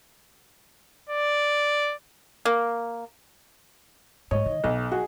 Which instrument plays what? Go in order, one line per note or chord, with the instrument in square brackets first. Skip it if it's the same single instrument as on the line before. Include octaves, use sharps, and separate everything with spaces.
[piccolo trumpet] D5
[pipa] A#3
[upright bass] G#2 [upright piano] C#5 [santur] D#5
[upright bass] D#3
[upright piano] B1 [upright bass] F#3 [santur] D#5
[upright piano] F#4 [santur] G#4